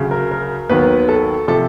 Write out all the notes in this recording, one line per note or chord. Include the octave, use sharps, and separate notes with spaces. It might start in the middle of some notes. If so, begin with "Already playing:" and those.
Already playing: D2 C#3 F#3
A#4
A#4
D#2 D#3 F#3 B3 B4
A4
C3 F3 A4